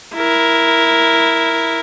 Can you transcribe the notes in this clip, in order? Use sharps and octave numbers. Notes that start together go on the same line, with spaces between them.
E4 A#4